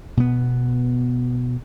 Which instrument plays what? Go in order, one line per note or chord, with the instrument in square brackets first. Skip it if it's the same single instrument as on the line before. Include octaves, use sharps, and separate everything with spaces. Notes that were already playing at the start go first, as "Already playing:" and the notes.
[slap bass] B2 B3